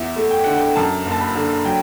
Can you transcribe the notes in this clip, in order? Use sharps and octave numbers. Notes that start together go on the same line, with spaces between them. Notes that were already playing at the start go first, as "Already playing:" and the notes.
Already playing: E2 E5
A3
G5
D3 F#5
G5
F#2 A5
F#1
A5
B5
D3
F#3 G5